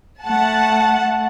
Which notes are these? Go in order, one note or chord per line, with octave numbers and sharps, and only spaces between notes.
A3 F#5 A5